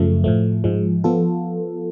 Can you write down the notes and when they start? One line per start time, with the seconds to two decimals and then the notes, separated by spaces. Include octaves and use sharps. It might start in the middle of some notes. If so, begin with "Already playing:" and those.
Already playing: F#2 C#3 F3 A3
0.24 A2 F3 A3
0.64 G#2 F3 G#3
1.04 F3 B3 F4 A4